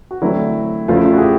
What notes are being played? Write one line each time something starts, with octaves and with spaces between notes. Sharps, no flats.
F#4
D3 F#3 A3 C4 E4
E2 C#3 F3 A3 F4
E4
F4
F#4
G#4
G4